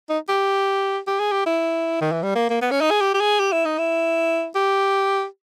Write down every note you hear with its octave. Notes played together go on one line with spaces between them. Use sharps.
D#4
G4
G4
G#4
G4
E4
D#3
E3
G3
A#3
A#3
B3
C#4
D#4
G#4
G4
G4
G#4
G4
E4
D#4
E4
G4